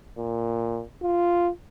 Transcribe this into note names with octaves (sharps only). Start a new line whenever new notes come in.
A#2
F4